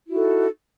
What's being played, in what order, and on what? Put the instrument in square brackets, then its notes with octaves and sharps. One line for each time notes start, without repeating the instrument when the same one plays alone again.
[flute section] E4
F#4
D#4
A4